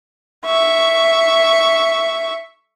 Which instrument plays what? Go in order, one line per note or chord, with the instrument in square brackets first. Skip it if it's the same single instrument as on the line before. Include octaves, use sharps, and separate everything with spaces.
[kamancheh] E5 C#6